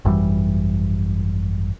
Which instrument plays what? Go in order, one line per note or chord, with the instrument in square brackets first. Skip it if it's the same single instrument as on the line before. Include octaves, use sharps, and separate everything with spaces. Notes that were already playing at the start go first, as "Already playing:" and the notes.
[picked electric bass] G#1 F#2 E3 G3